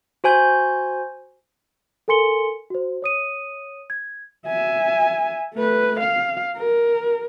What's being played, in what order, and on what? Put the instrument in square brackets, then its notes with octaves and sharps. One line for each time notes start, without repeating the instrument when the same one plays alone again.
[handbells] F#4 C5 G#5 G6
[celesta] A4 A#4 G#5 C6 C#7 G7
F#4 C5
C#5 D#6 D#7
G#6
[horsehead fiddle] E5 G#5
A3 B4
F5
A#4